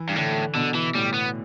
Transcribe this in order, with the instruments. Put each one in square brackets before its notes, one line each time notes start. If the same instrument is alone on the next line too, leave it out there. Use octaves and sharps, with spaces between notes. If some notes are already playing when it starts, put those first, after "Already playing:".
Already playing: [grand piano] E3
[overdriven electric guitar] G2
[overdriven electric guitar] A2 [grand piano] D3
[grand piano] B2 [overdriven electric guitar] D3
[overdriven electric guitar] E3
[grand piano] A2 [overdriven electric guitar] G3
[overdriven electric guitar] B3